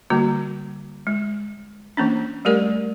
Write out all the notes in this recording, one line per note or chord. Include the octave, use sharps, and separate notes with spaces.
D3 G3 A#3 F#4
G#3
E3 A#3 C#4 D4
G3 A3 G4 A#4 D5